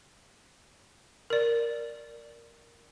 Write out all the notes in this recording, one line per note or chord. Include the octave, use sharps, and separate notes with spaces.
A#4 D5